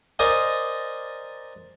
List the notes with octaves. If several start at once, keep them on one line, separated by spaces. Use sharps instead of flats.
A#4 C5 D5 D#5 G#5